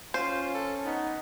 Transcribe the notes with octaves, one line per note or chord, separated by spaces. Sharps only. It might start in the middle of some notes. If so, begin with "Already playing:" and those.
C#4 F4 C5
A4
B3 D#4